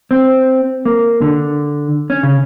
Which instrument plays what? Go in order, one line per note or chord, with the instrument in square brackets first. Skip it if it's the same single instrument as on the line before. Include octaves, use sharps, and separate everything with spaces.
[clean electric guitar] C4
A#3
D3
C#4
C#3